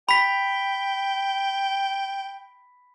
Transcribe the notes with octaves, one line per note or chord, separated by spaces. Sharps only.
G5 B5 B6